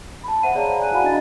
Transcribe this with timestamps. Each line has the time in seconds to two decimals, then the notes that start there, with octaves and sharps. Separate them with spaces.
0.24 A5 B5
0.43 C5 E5 F#5 D#7
0.55 G#4 C#5 D5 F5 A5 A#5
0.80 G#5 F#6 D#7
0.92 E4 F#4 F5 F#5 G#5 B5
1.04 D4 D#5 A#5 A6